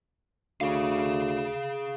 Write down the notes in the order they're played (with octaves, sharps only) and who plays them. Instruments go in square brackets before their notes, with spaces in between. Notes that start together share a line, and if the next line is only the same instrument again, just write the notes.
[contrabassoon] D2 [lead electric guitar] G#4 F5